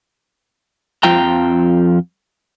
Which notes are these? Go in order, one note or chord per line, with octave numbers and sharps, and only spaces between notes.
F2 F3 G5 A#5